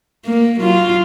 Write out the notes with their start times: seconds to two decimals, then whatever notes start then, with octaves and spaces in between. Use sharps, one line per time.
0.26 A#3
0.60 F#3 F4